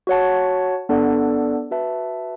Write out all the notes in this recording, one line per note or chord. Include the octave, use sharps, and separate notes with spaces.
F#4 C#5 F#5 A5
B3 D4 A4 D5 F#5
F#4 B4 E5 A5